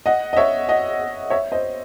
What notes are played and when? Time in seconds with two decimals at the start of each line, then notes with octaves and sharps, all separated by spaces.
0.06 D#5 F#5
0.33 D#5
0.37 C#5 E5
0.69 D#5 F#5
1.30 C#5 E5
1.52 C5 D#5